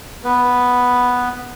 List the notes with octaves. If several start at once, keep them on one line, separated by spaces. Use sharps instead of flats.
B3 B4